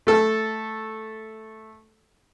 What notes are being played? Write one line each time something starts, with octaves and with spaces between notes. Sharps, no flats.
A3 A4